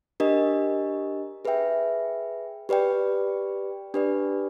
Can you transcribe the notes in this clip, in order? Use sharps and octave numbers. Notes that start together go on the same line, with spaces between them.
D4 G4 A#4 D#5
G#4 B4 E5 G5
G4 B4 D5 G5
D4 G4 B4 D5